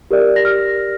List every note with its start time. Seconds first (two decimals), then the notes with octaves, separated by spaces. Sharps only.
0.11 G4 A#4 D5
0.36 A#6
0.45 F6